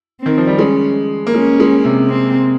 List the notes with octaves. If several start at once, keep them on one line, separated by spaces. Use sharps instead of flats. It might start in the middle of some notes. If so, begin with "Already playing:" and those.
C4
D#3
F3
G3
G#3 C#4
A#3
G#3 C#4
G#3
C3
C4